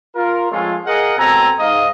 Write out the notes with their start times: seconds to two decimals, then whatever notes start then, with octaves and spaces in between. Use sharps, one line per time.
0.16 F4 A#4
0.51 F3 G#3 A3 C4 C#4 F4
0.86 G#4 A#4 D#5 F5 F#5
1.18 B2 C4 A4 G#5 A#5
1.59 G#2 D#5 F5